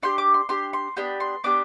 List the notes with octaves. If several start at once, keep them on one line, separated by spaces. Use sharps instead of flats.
D4 G4 C6
D6
C6
D4 G4 C6
C6
B3 D4 G4 B5
C6
B3 D4 G4 D6